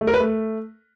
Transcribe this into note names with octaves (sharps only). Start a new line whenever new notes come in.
A3
A#4
B4
A3